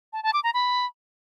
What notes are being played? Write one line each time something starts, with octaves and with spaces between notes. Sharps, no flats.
A5
A5
D6
A#5
B5